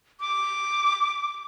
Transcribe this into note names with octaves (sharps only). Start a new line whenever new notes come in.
D6